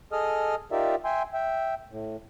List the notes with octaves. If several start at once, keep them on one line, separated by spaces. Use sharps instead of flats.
G#4 A4 D#5 D#6 F6
D#4 F4 G4 A#4 D5 E5
E5 G5 G#5 C6
E5 G5
A2